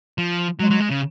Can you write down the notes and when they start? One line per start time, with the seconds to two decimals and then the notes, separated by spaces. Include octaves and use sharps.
0.18 F3
0.60 F#3 G#3
0.70 F#3
0.80 G#3
0.90 C#3